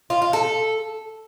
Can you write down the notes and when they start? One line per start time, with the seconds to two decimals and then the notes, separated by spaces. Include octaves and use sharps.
0.10 F4
0.22 F4
0.33 A4